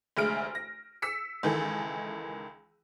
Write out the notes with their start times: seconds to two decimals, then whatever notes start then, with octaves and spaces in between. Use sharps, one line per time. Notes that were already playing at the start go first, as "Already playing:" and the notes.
0.17 F1 D2 G#3 F6 D7
0.55 A#6
1.02 E6 B6 C#7
1.43 C#2 D#3 E3 A4